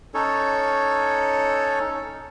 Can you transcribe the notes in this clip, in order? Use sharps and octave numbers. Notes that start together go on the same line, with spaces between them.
C#4 D#4 A4 C#5